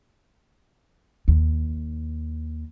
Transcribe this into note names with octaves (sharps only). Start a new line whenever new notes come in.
D#2